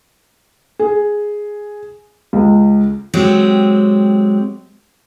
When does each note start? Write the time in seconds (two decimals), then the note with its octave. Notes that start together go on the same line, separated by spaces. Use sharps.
0.79 G#4
2.33 C#2
3.13 F#3 G#3 C4 G4